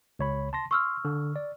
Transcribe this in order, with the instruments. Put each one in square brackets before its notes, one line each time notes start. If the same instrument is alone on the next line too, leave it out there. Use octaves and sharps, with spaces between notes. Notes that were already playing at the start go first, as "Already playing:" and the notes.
[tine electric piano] C#2 C#5 B5
A5 C6 A#6
[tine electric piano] C6 [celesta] C#6 E6 F6
[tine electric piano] D3
D5